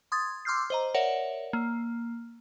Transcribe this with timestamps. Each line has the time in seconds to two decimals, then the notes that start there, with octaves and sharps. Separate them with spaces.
0.12 C6 D#6 G#6 A6
0.45 C6 D6 E6 F6 G6 C7
0.70 C5 D#5 A#5
0.94 A#4 C#5 D5 E5 F#5
1.53 A#3